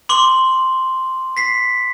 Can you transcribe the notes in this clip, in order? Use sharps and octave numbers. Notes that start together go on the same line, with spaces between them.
C6 D6 F#7
B6 C7